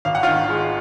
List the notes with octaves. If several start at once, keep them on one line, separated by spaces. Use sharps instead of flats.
G#1 F5
F#5
D#3 F4 F5
G#3